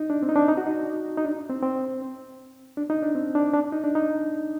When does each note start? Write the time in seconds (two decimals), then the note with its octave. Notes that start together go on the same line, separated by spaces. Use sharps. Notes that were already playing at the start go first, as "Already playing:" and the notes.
Already playing: D#4
0.10 D4
0.23 C4
0.29 D#4
0.35 D4
0.48 D#4
0.57 F#4
0.67 D#4
1.18 D#4
1.24 D4
1.50 C4
1.63 C4
2.77 D4
2.90 D#4
3.02 D4
3.15 C4
3.35 D4
3.53 D4
3.72 D#4
3.84 D4
3.95 D#4